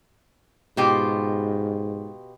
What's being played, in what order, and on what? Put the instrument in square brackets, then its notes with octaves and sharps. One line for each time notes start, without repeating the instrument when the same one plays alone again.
[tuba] G#2 [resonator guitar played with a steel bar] B2 F4 G4